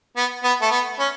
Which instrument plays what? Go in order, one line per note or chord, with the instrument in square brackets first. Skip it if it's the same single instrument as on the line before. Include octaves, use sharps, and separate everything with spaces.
[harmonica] B3
B3
A3
B3
C#4